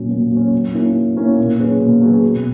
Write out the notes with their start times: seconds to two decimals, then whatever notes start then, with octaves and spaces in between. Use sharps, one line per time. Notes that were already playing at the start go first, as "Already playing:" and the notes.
Already playing: A#2 F#3 C#4
0.10 A#2
0.32 F#3 C#4
0.53 F#3
0.74 A#3 C#4 E4
0.96 F#3
1.17 A#3 C#4 E4
1.38 A#2
1.59 F#3 C#4 G#4 B4
1.80 A#2
2.02 F#3 C#4 G#4 B4
2.23 B2